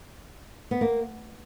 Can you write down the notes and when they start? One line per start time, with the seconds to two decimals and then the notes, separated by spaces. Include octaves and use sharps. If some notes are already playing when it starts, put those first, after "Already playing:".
0.71 B3
0.81 A#3